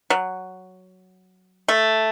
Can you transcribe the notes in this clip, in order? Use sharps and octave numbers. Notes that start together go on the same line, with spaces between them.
F#3
A3